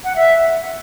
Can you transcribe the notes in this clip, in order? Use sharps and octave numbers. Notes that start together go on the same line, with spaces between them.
F#5
E5